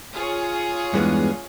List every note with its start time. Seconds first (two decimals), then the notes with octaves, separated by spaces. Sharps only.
0.13 F4 G#4 C#5
0.94 E2 G2 G#3 B3